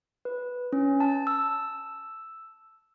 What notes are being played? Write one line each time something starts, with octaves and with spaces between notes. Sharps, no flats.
B4
C#4
A5
E6